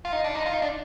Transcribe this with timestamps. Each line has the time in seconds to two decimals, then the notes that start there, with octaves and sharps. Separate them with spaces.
0.05 F4
0.12 D#4
0.24 D4
0.35 D#4
0.46 F4
0.54 D#4
0.62 D4